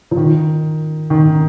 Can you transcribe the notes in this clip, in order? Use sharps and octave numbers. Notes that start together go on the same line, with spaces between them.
F3
D#3
D#3